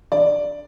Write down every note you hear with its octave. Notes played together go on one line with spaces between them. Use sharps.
D5